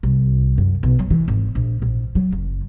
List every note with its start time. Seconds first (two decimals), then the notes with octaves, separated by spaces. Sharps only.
0.03 C2
0.58 F#2
0.83 B1
0.99 F#3
1.11 E3
1.28 G#1
1.55 A#1
1.82 A#1
2.15 F#3
2.32 F#1